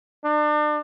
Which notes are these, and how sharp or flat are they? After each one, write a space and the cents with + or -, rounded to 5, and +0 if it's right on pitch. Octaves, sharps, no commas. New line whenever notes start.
D4 +35